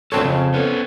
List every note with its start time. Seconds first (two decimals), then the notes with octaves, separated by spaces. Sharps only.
0.12 D2 C4 A4 C5 C#5 A5
0.25 F2 C#3
0.54 B3 C#4 A4